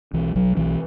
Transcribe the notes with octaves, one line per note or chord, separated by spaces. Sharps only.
B1 E3
B1 F#3
B1 E3